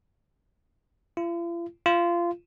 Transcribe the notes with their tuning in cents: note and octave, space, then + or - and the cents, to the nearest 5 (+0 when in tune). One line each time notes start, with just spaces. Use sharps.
F4 -45
F4 -20